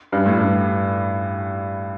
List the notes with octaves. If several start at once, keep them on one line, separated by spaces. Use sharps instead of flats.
G2
A2
G2